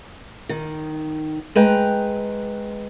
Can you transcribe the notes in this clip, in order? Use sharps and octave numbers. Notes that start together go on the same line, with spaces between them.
D#3
G#3 B4 G5 A#5